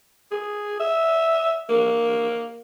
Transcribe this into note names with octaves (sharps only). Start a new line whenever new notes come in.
G#4
E5
A#3